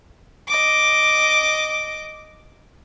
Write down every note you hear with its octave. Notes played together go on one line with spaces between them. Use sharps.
D#5 D6